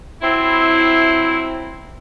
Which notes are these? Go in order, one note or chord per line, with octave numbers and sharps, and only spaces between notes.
F#3 C4 E4